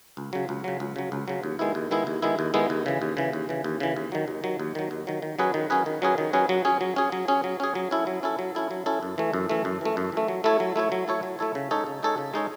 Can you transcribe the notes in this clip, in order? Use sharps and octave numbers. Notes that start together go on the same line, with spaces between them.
C#2
C#3 F#3
C#2
C#3 F#3
C#2
C#3 F#3
C#2
C#3 F#3
D#2
D#3 G#3 B3 E4
D#2
D#3 G#3 B3 E4
D#2
D#3 G#3 B3 E4
D#2
D#3 G#3 B3 E4
D#2
C#3 E3
D#2
C#3 E3
D#2
C#3 E3
D#2
C#3 E3
D#2
D#3 F#3
D#2
D#3 F#3
D#2
D#3 F#3
D#2
D#3 F#3
D#3
F#3 C#4 G#4 B4
D#3
F#3 C#4 G#4 B4
D#3
F#3 C#4 G#4 B4
D#3
F#3 C#4 G#4 B4
F#3
C#4 G#4
F#3
C#4 G#4
F#3
C#4 G#4
F#3
C#4 G#4
F#3
C#4 E4 A4
F#3
C#4 E4 A4
F#3
C#4 E4 A4
F#3
C#4 E4 A4
F#2
E3 A3
F#2
E3 A3
F#2
E3 A3
F#2
E3 A3
F#3
A3 E4 A4 C#5
F#3
A3 E4 A4 C#5
F#3
A3 E4 A4 C#5
F#3
A3 E4 A4 C#5
C#3
G#3 D#4 A4 C#5
C#3
G#3 D#4 A4 C#5
C#3
G#3 D#4 A4 C#5